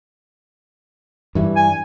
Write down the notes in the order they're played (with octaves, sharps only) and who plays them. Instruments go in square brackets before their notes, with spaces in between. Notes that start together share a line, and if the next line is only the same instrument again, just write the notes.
[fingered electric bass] G2 E3 G3
[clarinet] G#5